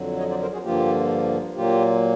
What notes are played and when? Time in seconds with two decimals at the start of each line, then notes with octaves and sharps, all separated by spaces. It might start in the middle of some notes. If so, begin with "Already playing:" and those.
Already playing: F2 D3 F#3
0.18 C#5 D#5
0.30 C5 D5
0.42 A#4 C5
0.53 F#4 G#4
0.64 G2 D3 F3 A#3 F4 G4
1.56 A#2 F#3 A#3 F4 G4